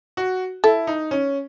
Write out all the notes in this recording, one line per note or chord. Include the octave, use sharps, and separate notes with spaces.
F#4
E4 A4
D#4
C#4